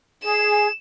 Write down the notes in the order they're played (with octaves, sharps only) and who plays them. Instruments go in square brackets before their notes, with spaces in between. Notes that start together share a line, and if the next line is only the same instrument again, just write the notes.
[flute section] G#4 [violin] E7